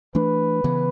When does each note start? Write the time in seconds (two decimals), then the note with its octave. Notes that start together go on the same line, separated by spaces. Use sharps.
0.15 E3 A3 D4 B4
0.64 C#3 E3 B3